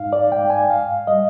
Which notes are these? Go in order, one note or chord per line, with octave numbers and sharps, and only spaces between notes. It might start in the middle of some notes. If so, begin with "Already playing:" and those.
Already playing: G#2 D#4 F5
D5
G#2 G5
G#5
G#2 F5
G3 D#5